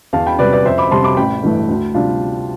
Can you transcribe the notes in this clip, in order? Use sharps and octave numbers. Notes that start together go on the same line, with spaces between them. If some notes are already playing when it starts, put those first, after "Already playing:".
E2 F5 A5
G5 B5
C3 G3 B4 D5
B4 D5
F2 C5 E5
B5 D6
C3 G3 C4 A5 C6
B5 D6
A1 G5 B5
G2 E3 A3
D2
C3 G3 D4 F4